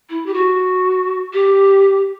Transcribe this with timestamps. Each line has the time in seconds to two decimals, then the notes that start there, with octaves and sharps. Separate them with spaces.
0.09 E4
0.25 G4
0.33 F#4
1.33 G4